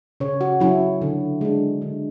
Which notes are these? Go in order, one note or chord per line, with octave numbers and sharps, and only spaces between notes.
C#3 C#5
F#4
F#3 C#4 E4
D3
G#3 D4
D3